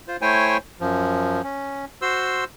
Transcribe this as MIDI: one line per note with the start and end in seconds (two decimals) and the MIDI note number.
0.08 0.17 65
0.08 0.17 72
0.22 0.57 57
0.22 0.57 64
0.22 0.57 72
0.22 0.57 73
0.22 0.57 79
0.22 0.57 80
0.80 1.42 42
0.80 1.42 53
1.43 1.85 61
2.02 2.44 66
2.02 2.44 72
2.02 2.44 84
2.02 2.44 88